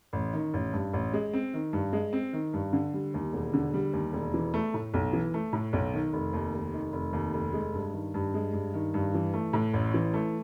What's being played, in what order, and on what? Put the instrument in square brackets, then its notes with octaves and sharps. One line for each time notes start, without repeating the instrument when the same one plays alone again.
[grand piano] A1
D#3
A1
G2
A1
G#3
C4
D#3
G2
G#3
C4
D#3
G2
D3
G3
D#2
E1
D3
G3
D#2
E1
E3
A3
A2
B1
E3
A3
A2
B1
D#3
F1
D#2
F1
D#3
F1
D#2
F1
G#3
G2
D#3
G2
G#3
G2
D#3
G2
E3
A3
A2
A1
E3
A3